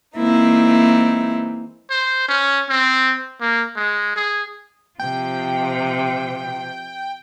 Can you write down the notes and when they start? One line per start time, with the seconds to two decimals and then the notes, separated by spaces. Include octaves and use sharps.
0.16 E3 G#3 A#3 C4 D#4 E4
1.90 C5
2.28 C#4
2.69 C4
3.41 A#3
3.76 G#3
4.16 G#4
4.99 C3 F3 G5